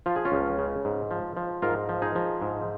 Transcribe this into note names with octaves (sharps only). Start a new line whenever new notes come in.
F3 F4
G#4
C#4 F4
C#2
C#3
G#2
F3
F3
G#2 F4 A#4
F3
D#4 G#4
F3
G#2